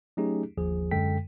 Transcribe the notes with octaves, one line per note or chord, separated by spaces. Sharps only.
F#3 A3 C#4 D#4 G4 G#4
G1 D#2 F3 G#4
F#2 D3 G#3 A4 G5 B6